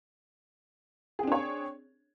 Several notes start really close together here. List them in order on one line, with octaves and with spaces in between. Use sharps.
G#4 C4 D4 C#5